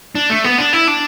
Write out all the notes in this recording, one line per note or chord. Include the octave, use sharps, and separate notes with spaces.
D4
A3
B3
D4
E4
D4